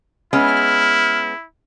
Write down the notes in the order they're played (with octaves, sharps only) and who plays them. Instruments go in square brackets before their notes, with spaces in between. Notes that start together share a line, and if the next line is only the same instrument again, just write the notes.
[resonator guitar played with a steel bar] G#3 B3 C#4 [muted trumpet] E4 [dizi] F6